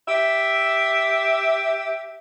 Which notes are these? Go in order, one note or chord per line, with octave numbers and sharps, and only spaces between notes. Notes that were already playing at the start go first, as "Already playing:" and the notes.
G4 E5